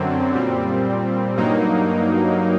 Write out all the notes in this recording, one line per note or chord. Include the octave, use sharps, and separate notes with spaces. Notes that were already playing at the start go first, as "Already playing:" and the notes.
Already playing: F#2 D3 F#3 C4
A#2 G3 C4
G2 F#3 A#3 D#4